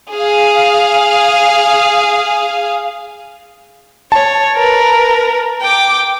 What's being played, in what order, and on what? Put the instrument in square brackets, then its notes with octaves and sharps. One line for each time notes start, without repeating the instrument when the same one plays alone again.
[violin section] G#4 F5
[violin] C#5 [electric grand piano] A5
[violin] A#4 B4
G5 D6